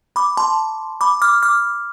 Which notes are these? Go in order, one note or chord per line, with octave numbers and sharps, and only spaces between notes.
B5 D6
A5 C6
B5 D6
D6 F6
D6 F6